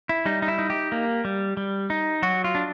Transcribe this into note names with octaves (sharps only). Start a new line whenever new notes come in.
E4
G3 D#4
D#4
E4
D#4
G4
A#3
G3
G3
D#4
F#3 F#4
F4
D4